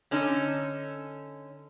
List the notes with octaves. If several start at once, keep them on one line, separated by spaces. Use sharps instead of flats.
D3 C#4 D#4 A4